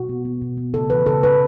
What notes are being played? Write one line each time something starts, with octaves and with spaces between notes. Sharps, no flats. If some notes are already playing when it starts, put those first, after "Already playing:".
Already playing: B2 F#4
B3
B3
B2
B3
C#3 A4
E3 B4
C#3 A4
C#4 B4